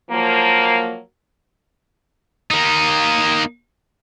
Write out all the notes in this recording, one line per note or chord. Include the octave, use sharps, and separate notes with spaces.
F3 F#3 A#3
A#3 D#4